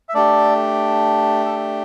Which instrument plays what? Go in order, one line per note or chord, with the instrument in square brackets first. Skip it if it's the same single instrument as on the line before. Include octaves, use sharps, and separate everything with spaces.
[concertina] E5
A3 D4 G4 A4 D5
A4